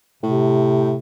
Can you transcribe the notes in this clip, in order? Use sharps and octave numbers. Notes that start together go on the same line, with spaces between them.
A2 C3